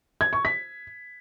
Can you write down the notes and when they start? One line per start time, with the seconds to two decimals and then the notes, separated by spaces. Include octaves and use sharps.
0.21 G#6
0.33 C#6
0.45 B6